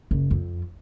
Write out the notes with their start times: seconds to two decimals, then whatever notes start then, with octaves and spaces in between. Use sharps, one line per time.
0.11 F#1
0.31 F2